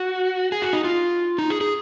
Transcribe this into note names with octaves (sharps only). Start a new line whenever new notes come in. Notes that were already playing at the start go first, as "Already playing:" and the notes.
Already playing: F#4
G#4
F#4
D#4
F4
D#4
G#4
G#4